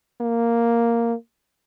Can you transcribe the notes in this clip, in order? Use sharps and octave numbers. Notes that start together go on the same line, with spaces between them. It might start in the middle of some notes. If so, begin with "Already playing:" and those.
A#3